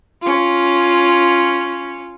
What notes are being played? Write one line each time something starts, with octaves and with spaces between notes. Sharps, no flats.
C#4 F4